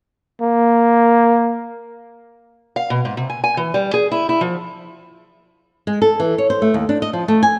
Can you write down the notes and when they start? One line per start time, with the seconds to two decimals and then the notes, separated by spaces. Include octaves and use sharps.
0.41 A#3
2.76 F5
2.90 B2
3.05 G#2
3.17 C3
3.30 G#5
3.44 G#5
3.57 E3
3.74 G3
3.94 G#4
4.12 E4
4.29 E4
4.41 F3
5.87 G#3
6.02 A4
6.20 E3
6.38 C#5
6.50 C5
6.62 A3
6.74 D#2
6.89 D4
7.02 D#5
7.13 F3
7.28 A3
7.43 G#5